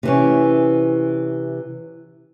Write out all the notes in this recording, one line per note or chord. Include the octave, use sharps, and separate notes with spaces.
C3 E3 C#4